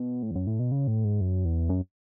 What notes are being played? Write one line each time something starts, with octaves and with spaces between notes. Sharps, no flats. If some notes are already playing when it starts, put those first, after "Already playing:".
Already playing: B2
A2
E2
F#2
A2
B2
C#3
A2
G#2
F#2
E2
F#2